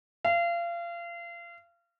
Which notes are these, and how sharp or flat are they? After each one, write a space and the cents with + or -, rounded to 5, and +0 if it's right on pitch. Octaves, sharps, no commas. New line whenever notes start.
F5 -30